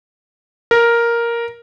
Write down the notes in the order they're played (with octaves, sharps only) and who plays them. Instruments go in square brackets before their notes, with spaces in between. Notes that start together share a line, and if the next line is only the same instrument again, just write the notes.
[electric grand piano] A#4